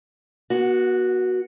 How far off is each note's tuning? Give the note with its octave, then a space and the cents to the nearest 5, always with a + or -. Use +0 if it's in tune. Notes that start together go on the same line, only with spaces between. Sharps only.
B3 -40 F#4 +0